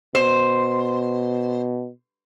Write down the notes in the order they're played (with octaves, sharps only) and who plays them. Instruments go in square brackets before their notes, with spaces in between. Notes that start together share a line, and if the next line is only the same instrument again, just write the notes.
[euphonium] B2 [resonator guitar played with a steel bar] C5